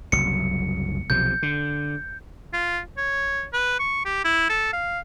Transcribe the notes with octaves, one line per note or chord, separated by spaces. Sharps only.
F#1 C2 F#3 C#7
B1 C3 F3 G6
D3
F4
C#5
B4
C#6
G4
E4
A4
F5